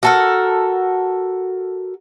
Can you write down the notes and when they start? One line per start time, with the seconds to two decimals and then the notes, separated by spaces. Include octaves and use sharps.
0.03 F#4 A4 A#4